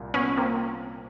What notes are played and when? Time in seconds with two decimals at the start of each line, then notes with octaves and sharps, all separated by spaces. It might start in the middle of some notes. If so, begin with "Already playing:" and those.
Already playing: C2 A#2
0.14 B3 C#4
0.37 A#3 C4